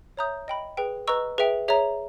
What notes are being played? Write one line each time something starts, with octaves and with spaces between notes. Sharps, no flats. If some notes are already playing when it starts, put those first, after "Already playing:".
C#5 E5 A#5 D#6 G6
D#5 G5 B5
G#4 B4 G5
B4 D#5 A#5 C#6 E6
G#4 B4 E5 G5
G#4 C#5 E5 A#5